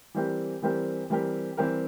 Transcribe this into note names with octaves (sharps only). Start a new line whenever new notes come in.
E3 G3 C4 G4 A#4
E3 G3 C4 G4 A#4
E3 G3 C4 G4 A#4
E3 G3 C4 G4 A#4